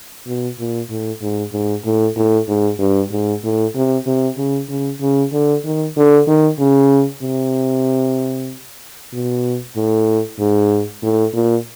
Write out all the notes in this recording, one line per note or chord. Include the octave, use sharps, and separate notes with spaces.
B2
A#2
A2
G#2
G#2
A2
A2
G#2
G2
G#2
A2
C3
C3
C#3
C#3
C#3
D3
D#3
D3
D#3
C#3
C3
B2
A2
G#2
A2
A#2